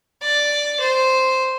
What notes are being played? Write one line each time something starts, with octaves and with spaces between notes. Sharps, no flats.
D5
C5